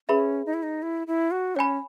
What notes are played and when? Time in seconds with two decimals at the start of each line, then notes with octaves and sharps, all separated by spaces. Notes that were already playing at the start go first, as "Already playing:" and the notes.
0.09 C#4 G#4 B4 E5 B5
0.46 D#4
0.54 E4
0.63 D#4
0.82 E4
1.07 E4
1.31 F#4
1.56 C#4 C#5 G#5 B5